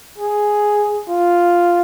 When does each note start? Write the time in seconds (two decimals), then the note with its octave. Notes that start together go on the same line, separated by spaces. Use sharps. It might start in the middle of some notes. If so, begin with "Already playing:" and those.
0.18 G#4
1.09 F4